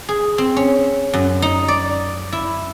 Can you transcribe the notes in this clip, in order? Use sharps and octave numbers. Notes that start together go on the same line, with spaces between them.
G#4
C4
C#4
F#2
D#4
D5
E4